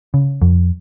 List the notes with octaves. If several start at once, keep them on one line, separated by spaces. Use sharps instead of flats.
C#3
F2